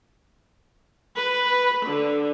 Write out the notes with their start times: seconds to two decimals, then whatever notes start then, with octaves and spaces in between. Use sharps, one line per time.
1.18 B4
1.88 D3